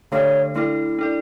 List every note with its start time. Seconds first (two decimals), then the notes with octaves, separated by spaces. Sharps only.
0.12 D3 A3 D4 A4 C#5
0.55 A3 D4 E4 A4
0.99 D4 A4 D5